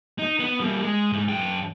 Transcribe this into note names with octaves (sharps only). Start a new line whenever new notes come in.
D#4
B3
G3 A#3
G#3
G#2 G#3
F#2 G5